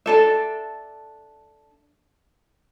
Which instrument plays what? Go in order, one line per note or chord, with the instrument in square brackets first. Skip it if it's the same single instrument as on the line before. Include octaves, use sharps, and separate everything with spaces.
[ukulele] D4 A4 E5